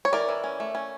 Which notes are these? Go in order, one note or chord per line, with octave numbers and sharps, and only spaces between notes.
C#5
E3 A#4 D5
E3
C#4
A3
C#4